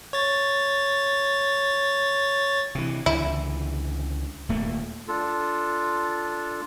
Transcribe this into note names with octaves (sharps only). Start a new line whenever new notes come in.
C#5 A6
C3 E3
C#2 D3 E3 E4
D#1 A3 A#3
D4 F4 A4